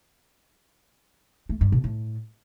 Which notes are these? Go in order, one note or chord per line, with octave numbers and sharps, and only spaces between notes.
A3
G2
B2
A2